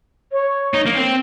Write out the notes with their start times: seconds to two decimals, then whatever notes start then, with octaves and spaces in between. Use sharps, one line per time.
0.32 C#5
0.74 D#4
0.86 A#3
0.95 C4